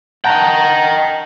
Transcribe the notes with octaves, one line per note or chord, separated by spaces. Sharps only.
D#5 F#5 G5 A5 A#5